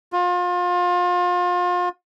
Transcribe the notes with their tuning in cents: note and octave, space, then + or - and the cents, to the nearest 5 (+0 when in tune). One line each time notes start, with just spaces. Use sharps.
F4 +30